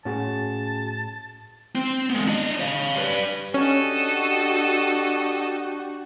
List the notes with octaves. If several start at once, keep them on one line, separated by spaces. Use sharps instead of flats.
A2 C#4 F#4 G#4 A5
C4
G#3 B3
D4 D#5
C#5 F5
G3 B4
C#4 D4 F#4 G4 A4 D#5